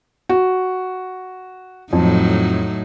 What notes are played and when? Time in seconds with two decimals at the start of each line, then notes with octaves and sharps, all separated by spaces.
0.29 F#4
1.93 F2 A2 F#3 D#4